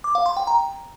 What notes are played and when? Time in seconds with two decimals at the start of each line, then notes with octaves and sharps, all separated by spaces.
0.04 D6
0.15 F5
0.26 C6
0.37 G5
0.47 A#5